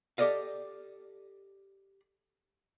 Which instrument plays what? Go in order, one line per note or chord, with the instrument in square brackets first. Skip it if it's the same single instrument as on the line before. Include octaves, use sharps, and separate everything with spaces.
[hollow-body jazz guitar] G4 A4 D5 D#5 F5